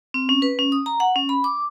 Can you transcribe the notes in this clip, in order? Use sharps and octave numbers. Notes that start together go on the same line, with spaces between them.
C4
C#4
B4
C#4
D#6
A#5
F#5
C#4
B5
D6